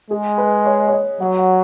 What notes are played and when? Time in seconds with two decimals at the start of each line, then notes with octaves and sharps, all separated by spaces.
0.10 G#3 G#4
0.38 B4
0.66 C#5
0.88 C#5
0.92 D#5
1.20 F#3 F#5
1.38 F#5